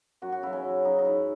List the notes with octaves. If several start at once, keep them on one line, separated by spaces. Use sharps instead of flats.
F#2 F#4
F#4
C#3 F#3 E4
C#4
F#2
C#3 F#3 D#4
D#4
G#2 E4